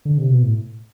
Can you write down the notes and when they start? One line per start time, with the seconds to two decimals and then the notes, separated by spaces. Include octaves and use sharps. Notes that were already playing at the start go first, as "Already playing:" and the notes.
0.05 D3
0.18 C3
0.30 B2
0.43 A2